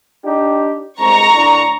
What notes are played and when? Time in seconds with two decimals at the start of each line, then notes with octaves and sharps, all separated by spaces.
0.25 D4 D#4 G4
0.99 C2 G#2 A#5 C#6
1.34 A2 D3 D4